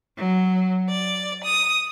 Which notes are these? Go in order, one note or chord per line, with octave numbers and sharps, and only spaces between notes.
F#3
D5
D#6